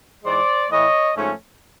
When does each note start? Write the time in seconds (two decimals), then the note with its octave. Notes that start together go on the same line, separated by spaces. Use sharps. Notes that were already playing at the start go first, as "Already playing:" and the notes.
0.25 G#2 E3 G#3 C5 D5
0.70 A2 E3 A3 C#5 D#5
1.15 G#2 F3 A3 C#4